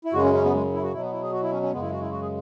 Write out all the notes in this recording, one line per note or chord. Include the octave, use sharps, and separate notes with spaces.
E4
F#2 C#3 G#3 F#4
C#4
C#4
B3
G#3
E4
F#4
B2 F#3 E4
B3
E4
G#4
F#4
E4
C#4
C#4
F#2 C#3 G#3 B3
E4
F#4
E4
F#4
G#4